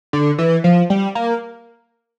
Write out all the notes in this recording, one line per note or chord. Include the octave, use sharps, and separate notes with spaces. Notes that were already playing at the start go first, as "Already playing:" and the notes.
D3
E3
F3
G3
A#3